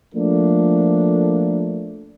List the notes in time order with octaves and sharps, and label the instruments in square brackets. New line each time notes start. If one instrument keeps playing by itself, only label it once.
[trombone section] F3 A3 A#3 D4